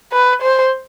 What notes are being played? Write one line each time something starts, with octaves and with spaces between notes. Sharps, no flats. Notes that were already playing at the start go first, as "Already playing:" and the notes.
B4
C5